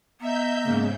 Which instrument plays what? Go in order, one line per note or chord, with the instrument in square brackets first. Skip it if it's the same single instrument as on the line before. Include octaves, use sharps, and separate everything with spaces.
[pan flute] B3 [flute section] D#5 A#5 [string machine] E5 G6
[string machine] G#2 C#3 [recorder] A#3